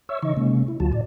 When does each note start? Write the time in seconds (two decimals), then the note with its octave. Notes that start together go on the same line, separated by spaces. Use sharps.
0.09 C#5 E5 C#6 E6
0.22 C#3 E3 D#4 D#5 C#6
0.37 C3 G#3 A#3 C#4
0.68 E4
0.80 D2 D3 F#3 F4 F#4 A5
0.93 A2 D5